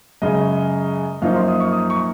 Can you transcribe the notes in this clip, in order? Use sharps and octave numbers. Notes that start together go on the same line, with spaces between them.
F#2 C#3 G#3 D#5
F#2 F3 A#3 D#4 F5
C6
D#6
C#6
D#6
C#6